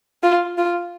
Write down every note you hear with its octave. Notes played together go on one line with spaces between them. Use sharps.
F4
F4